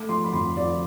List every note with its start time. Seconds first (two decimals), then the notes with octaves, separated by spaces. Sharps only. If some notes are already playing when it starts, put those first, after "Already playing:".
Already playing: A3 D6
0.09 F3 C6
0.24 B5
0.33 F2 C6
0.57 F3 D5